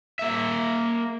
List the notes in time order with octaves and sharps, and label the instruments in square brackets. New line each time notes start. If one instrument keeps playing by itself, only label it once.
[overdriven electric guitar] A#3 E5